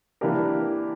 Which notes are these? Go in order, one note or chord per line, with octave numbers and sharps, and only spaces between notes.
E3 A#3 D4 G4 A#4